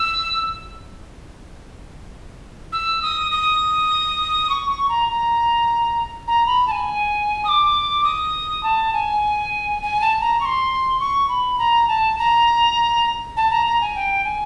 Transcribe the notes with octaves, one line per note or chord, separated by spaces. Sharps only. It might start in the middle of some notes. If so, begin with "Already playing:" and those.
Already playing: E6
E6
D#6
D#6
C#6
C#6
A#5
A#5
A#5
B5
A5
G#5
D#6
D6
D#6
A5
G#5
G#5
A5
A#5
C#6
C6
C#6
B5
A#5
A5
A#5
A5
A#5
A#5
G#5
G5
G#5